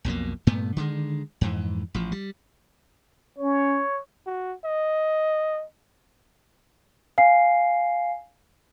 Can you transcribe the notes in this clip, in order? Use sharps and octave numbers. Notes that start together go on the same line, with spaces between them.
B1 F2 B2 A#3
G2 A#2 A3 B3
D3 D#3 G#3
F2 G#2 E3
A1 F3
G3
C#4 C#5
F#4
D#5
F5 G#5 C7